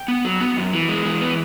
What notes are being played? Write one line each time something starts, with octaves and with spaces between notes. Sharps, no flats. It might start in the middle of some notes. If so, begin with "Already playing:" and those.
Already playing: G5
B3
F#3
B3
F#2
E3
G#3
E3
B3